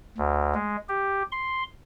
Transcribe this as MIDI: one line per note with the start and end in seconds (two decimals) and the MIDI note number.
0.18 0.54 38
0.54 0.77 56
0.89 1.23 67
1.32 1.63 84